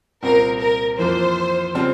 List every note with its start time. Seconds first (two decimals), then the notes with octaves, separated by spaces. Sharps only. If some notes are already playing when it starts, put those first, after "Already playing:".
0.22 C2 A#2 G3 C4 A#4
0.60 A#4
0.98 F2 E3 A#3 F4 C5
1.74 C#3 G3 C4 F4